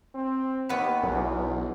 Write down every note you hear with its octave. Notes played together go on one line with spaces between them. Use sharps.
C4
D#2 B3 B4
B1 E2